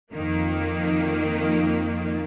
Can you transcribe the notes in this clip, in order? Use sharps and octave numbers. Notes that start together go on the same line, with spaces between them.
F2 D#3 A#3